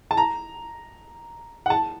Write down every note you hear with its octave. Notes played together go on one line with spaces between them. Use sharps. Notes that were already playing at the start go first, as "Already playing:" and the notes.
A5
A#5
F#5
A5